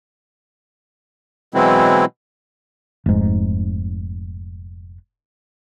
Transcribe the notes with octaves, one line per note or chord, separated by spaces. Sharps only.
B2 E3 F#3 G#3 C4 E4
F1 G#2